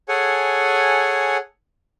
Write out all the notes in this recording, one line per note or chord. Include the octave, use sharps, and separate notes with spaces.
G#4 A4 C#5 F#5 G#5